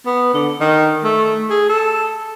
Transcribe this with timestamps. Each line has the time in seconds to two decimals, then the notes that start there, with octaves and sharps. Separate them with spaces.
0.06 B3
0.34 D3
0.60 D#3
1.04 A3
1.50 G#4
1.69 A4